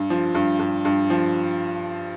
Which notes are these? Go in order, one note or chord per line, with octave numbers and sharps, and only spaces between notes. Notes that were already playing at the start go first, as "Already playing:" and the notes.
Already playing: G2
F3
G2
G2
G2
F3